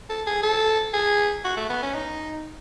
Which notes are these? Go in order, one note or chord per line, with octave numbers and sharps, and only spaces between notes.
A4
G#4
A4
G#4
F#4
A3
B3
C#4
D#4